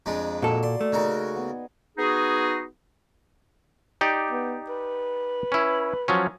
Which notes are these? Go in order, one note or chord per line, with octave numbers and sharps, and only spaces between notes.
F2 G#3 D4 A#5 D#6
A#2 A#3 F#4 A4
D5 C6
A3
C#3 D#4 F#4 G#4 A#4
B3
B3 D#4 F#4 G#4
D#4 G4 D5
B3
B4
C#4 E4
F3 F#3 C#4